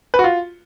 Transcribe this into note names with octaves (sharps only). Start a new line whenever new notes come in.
B4
F#4
F4